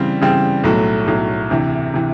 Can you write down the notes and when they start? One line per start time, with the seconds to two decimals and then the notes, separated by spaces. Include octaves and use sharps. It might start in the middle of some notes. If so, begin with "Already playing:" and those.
Already playing: C#3 E3 G3 C4
0.21 C#3 E3 G3 C4
0.64 B1 A2 F#3 A3
1.06 B1 A2 F#3 A3
1.50 D2 C3 E3
1.94 C3 E3